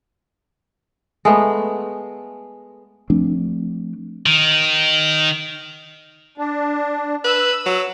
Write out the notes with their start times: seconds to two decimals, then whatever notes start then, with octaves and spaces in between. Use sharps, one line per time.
1.25 G#3 A3 B3
3.10 F3 A3 C4 D4
4.26 D#3
6.38 D4
7.24 B4 E6
7.66 F#3